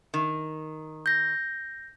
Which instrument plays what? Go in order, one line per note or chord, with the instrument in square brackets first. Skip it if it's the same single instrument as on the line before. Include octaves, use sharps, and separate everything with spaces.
[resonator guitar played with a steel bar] D#3
[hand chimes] G6 A#6